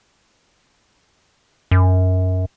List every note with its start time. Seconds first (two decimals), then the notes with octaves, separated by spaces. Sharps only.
1.71 F#2